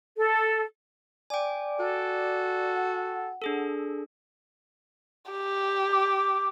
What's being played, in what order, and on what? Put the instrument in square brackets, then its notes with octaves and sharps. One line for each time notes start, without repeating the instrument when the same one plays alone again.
[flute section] A4
[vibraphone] D5 D6 [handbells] G5 G#5
[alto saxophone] F#4 [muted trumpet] A4
[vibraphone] F#5
[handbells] D4 G#4 A4
[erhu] G4
[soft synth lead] D6